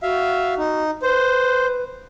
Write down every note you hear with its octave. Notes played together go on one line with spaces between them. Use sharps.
F#4 E5 F5
D#4
B4 C5